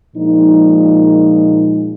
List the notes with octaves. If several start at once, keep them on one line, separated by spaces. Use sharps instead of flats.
A#2 F3 G#3 D#4